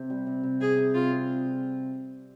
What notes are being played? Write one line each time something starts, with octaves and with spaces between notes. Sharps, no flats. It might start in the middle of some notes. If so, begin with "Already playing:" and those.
Already playing: C3 C4 G4
G3
C3
C3
C3 G#4
C3
C3 F4
C3